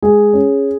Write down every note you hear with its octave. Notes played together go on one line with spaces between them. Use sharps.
G#3 G#4
C#4